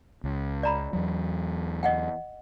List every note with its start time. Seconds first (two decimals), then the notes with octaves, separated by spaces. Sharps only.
0.24 C#2
0.63 D5 A#5 B5
0.93 E2 F#3
1.83 D#5 F#5 G5